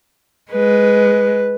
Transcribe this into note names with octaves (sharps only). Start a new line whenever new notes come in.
G#3 B4